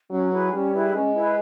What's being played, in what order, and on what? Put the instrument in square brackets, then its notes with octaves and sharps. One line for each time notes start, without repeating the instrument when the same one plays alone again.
[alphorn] F#3 [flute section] C#4
[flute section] E4 G#4 B4
[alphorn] G3 [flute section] C#4
[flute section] E4 G#4 B4
[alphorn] G#3 [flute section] C#4
[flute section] E4 G#4 B4